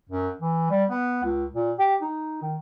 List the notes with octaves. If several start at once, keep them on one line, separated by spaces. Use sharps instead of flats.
F#2
E3
G3
B3
C#2
A#2
G4
D#4
D#3